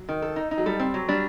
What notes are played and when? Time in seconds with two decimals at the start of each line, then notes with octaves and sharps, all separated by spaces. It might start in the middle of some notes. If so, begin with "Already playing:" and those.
Already playing: F#3
0.09 D#3
0.22 A4
0.36 D#4
0.51 D#4
0.58 F#3
0.66 G3 A4
0.80 C4
0.94 F#3
1.08 G3 D4